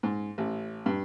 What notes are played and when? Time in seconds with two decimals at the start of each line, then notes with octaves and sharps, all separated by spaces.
0.03 G#2
0.38 A1
0.86 G2